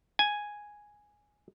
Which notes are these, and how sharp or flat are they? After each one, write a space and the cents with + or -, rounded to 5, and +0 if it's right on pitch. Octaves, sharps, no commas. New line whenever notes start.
G#5 +0